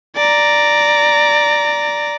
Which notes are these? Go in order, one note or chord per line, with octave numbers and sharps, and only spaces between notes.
D5 A#5